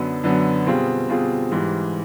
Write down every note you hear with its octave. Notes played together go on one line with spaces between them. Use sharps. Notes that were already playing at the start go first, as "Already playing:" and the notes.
Already playing: F#2 D3 F#3 B3
F#2 D3 F#3 B3
B2 G3 C4 F4 G#4
B2 G3 C4 F4 G#4
G#2 E3 G3